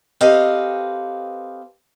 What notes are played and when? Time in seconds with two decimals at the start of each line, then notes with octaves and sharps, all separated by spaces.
0.21 C4 G4 A4 B4 D#5 F5